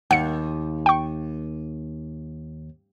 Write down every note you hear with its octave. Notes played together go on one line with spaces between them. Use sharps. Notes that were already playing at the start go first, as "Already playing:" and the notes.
D#2 F#5 C#7
G5 C#6